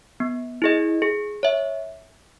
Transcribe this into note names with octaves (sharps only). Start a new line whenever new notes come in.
B3
E4 G#4 D#5
G#4
C#5 E5